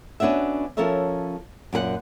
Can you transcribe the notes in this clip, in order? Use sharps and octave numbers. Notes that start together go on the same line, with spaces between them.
B3 C#4 D4 F#4 E5
F3 C#4 A4 A#4 C#5 E5
F#2 A#2 A4 F#5